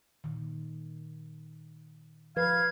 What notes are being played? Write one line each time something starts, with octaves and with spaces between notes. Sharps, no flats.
A#2 D#3
F3 B4 F5 G#6